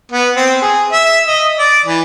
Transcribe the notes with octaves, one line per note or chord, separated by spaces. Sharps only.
B3
C4
G#4
E5
D#5
D5
E3